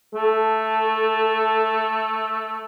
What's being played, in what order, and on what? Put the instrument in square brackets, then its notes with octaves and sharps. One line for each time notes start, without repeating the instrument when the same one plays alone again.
[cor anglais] A3 [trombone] A4